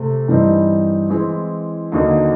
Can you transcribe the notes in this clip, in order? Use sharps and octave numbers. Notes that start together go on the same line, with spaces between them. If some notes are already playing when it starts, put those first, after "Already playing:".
Already playing: C3 A3
G2 E3 G3 C4 D#4
E3 G#3 C4 E4
D#2 D3 F#3 A#3 D#4